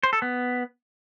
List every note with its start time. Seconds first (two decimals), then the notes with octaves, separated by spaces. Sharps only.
0.03 C5
0.13 A4
0.22 B3